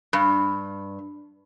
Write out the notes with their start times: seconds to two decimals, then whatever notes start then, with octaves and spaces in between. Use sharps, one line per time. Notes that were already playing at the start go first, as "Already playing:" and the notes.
0.13 G2